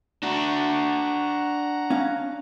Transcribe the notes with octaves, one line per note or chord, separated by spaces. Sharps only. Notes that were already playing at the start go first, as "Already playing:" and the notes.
D4 F#4 F#5 A#5
C#4 F5